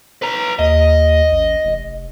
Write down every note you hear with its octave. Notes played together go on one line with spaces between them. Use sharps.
B4 A#5
D#2 D#5
A1
F1